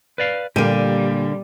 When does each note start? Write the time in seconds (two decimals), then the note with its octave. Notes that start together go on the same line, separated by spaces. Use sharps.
0.18 B4 D5 F5
0.56 A#2 D3 G3 A#3 G4 D#7